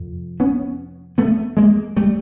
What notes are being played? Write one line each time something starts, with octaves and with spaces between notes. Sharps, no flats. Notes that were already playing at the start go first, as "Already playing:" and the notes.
Already playing: F2 C3
B3 C#4
A3 B3
G#3 A#3
G3 A3